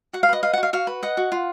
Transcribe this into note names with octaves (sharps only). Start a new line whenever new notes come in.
F#4 F#5
F5
B4 D#5
D#5 F5
F#5
F#4
F5
F#4 F5
B4
D#5 F#5
F#4
F4